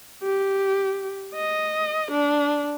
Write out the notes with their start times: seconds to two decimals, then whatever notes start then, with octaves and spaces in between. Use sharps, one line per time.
0.23 G4
1.35 D#5
2.11 D4